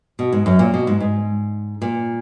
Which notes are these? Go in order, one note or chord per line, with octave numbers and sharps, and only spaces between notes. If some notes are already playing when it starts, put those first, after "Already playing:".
B2
G#2
F#2
A#2
B2
G#2
G#2
A#2